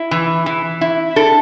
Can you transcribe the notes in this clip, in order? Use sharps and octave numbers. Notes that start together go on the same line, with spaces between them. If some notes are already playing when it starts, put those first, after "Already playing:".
Already playing: E4
E3
E3
E4
D4 A4